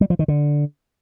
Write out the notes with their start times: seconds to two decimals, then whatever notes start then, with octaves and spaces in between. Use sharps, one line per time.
0.01 G3
0.10 F3
0.19 D#3
0.28 D3